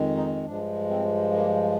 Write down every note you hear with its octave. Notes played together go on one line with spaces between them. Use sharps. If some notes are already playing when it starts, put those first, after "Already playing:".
Already playing: F2 D#3 G#3
D#4
G2 F3 G#3 D4
C4
A#3